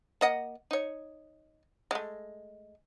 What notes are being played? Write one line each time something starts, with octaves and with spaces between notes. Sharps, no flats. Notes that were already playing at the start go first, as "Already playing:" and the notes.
A#3 D#5 F#5
D#4 C#5
G#3 A3